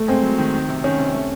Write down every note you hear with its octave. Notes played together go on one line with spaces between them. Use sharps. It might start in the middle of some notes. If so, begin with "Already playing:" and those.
Already playing: A3
G#3 C4
F#3
D#3
D#3
C3
D#3 C#4
C3
A3